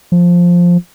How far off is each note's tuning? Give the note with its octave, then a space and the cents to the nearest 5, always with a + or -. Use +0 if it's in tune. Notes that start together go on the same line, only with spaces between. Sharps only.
F3 +5